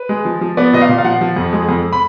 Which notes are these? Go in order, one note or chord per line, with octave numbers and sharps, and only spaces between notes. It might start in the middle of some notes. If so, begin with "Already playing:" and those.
Already playing: B4
G#3
F3
F3
B3 D5
A#2 D#5
F5
A#2
F5
F3 F#5
F3
F2
G#3
F2
B5